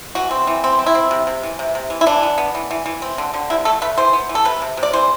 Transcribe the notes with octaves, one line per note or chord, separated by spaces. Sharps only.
E3 F#4
C4
E3
C4
C4
E4
C4
C3
C3
E3
C3
C3
E3
E4
E3 D4
B3
B3
E3
E3
E3
C4
D3
D3
C3 E4
A3 A4
A3 B4
E3 C5
B3
E3
A4
C3 B4
C3
C3
D5
E3 C5